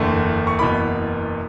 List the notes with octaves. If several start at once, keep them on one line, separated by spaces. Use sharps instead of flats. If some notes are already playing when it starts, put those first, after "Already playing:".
Already playing: F#1 E2 D3 A3
C#6
F#1 E2 B2 B5 D6